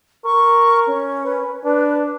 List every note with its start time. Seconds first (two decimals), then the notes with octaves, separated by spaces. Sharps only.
0.25 A#4 C#6
0.87 C#4
1.25 B4
1.64 D4 B4